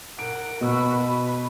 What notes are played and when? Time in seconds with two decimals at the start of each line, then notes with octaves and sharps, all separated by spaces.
0.19 A#4 F#5 D7
0.61 B2 F#4 B5 E6
1.05 B4